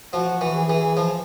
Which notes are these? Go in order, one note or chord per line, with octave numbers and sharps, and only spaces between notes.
F3 F#4
E3
G#4
E3
F3